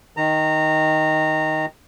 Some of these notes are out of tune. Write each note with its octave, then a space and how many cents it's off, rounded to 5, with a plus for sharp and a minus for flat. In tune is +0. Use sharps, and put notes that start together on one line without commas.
D#3 +5 A#5 -20